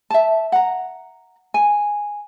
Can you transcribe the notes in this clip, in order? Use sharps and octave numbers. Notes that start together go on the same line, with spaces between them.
E5 A5
F#5 A#5
G#5